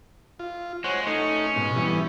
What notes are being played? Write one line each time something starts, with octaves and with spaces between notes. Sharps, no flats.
F4
G#3 C5 C#5 F#5
A3 C#4 D#4
G#2 B2
E3 G3 B3